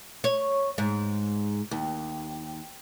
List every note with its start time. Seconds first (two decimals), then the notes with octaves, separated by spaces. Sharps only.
0.24 C#5
0.78 G#2
1.71 D#2